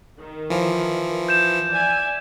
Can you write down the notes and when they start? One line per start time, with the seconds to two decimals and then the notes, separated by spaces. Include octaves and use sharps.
0.20 D#3
0.50 E3 F3
1.29 G6 E7
1.71 D5 E5 G#5